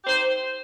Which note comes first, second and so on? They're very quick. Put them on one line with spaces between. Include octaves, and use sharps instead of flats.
G4 C5 D#4